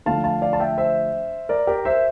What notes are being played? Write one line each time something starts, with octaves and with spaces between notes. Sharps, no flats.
D3 F3 A3 D4 F5 A5
F5 A5
D5 F5
A5
E5 G5
C5 E5
A#4 D5
G4 A#4
C5 E5